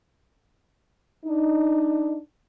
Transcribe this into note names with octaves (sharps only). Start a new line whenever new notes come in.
D4 D#4